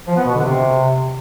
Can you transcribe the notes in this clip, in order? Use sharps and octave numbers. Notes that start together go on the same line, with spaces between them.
F3
B3
B2
D3
C3